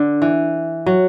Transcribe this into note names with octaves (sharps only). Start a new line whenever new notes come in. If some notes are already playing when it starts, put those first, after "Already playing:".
Already playing: D3
E3
F#3